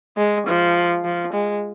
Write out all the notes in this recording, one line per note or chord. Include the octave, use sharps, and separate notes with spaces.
G#3
F3
F3
G#3